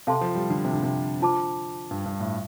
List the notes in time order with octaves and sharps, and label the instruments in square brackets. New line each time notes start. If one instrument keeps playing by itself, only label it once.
[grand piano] C3 [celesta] A4 F5 A5 C6
[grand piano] F3
G3
D3
C3
D3
C3
[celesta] D4 F4 C5 A5 D6
[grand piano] G2
G2
A2